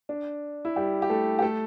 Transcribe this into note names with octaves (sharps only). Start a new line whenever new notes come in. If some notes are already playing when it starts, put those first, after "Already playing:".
D4
E4
G3 G4
G4
A3 A4
G4
A3 A4